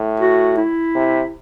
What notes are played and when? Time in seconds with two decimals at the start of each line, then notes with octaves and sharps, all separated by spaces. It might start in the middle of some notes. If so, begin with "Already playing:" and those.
Already playing: A2
0.20 F#4
0.57 E4
0.95 C3